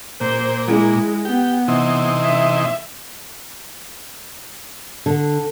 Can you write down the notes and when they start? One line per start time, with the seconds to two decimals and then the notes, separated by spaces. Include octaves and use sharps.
0.21 A#2 C5
0.67 G#3 E4
1.25 B3 G4
1.68 C3 E3 D#4
2.24 E5
5.06 D3